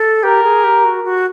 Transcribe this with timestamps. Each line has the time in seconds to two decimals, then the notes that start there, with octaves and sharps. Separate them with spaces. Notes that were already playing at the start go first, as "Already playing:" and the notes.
Already playing: A4
0.23 G4 A#4
0.44 G#4
0.64 G4
0.84 F#4
1.04 F#4